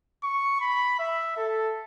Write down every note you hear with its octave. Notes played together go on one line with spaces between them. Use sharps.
C#6
B5
E5
A4